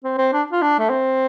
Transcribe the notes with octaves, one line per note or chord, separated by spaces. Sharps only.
C4
C4
D4
F4
D4
A3
C4